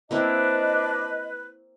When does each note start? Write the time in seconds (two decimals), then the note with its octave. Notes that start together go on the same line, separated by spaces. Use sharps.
0.11 A#3 C4 D4 E4 B4 D#5